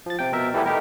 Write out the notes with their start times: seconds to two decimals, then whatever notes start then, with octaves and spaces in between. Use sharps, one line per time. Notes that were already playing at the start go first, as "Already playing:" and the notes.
0.06 F3 A6
0.19 C3 G5
0.32 B2 A#4 E5
0.54 E3 G3 A3 B3 E4 G4
0.66 A3 D#4 G4 A#4